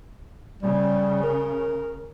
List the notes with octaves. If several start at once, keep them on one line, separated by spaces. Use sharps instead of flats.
C#3 G3
A#4